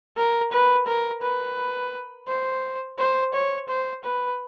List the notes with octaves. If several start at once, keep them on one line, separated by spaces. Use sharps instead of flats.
A#4
B4
A#4
B4
C5
C5
C#5
C5
B4